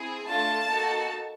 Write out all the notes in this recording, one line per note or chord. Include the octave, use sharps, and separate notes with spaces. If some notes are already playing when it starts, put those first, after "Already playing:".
Already playing: C4 E4 G#4
A3 D4 F4 A5
A#3 D#4 F#4 A4